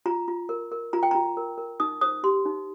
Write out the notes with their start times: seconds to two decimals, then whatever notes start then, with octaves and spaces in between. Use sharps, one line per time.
0.06 F4 A#5
0.28 F4
0.49 A#4
0.72 A#4
0.93 F4 A#5
1.03 G5
1.11 F4 A#5
1.37 A#4
1.58 A#4
1.80 D#4 D#6
2.01 C5 D#6
2.23 G4 C6
2.46 D#4